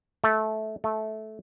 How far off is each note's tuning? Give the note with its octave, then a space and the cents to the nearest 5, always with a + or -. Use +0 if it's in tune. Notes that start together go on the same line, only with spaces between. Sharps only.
A3 -15
A3 -15